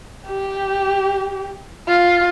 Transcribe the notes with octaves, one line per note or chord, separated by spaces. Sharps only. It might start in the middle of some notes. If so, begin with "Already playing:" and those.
G4
F4